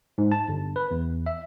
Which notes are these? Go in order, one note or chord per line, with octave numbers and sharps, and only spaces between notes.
G#2
A5
G1
B4
E2
E5